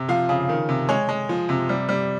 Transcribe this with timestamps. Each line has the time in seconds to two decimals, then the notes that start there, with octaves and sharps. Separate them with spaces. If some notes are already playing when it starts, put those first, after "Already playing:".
Already playing: C3
0.08 F3 F5
0.29 C#3
0.49 D#3
0.69 C3
0.89 G#3 C#5
1.09 G#3
1.29 F3
1.49 C3
1.69 G3
1.89 G3